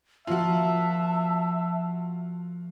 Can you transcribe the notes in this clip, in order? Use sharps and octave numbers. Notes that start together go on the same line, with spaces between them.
F3 A#3 F4 F#4 E5 A5